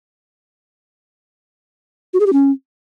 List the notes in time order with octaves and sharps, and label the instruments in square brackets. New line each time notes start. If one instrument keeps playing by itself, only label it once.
[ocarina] F#4
G#4
G4
C#4